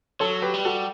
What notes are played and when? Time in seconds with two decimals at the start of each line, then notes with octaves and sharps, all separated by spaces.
0.20 F#3 A4 C#5
0.42 G4 B4
0.54 G3
0.65 F#4 A4